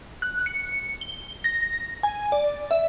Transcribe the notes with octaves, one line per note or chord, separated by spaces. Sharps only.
F#6
C#7
G7
A#6
G#5
D5
E5